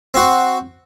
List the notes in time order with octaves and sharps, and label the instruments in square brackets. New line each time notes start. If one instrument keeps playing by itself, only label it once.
[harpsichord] C4 F#4